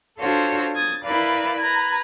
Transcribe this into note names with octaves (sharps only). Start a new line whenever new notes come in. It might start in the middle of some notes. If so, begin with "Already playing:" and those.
D4 F4 F#4 A4 C5 C#5
D#6 G#6 A6
E4 A#4 B4 D5 F5
B4 A#5 G#6